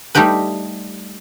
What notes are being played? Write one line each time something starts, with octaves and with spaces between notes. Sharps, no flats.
G3 A3 D#4 G4 B4